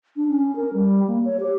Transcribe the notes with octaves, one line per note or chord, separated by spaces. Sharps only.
D4
C#4
A#4
G3
A#3
C#5
G4